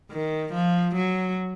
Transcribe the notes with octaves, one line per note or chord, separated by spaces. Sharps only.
D#3
F3
F#3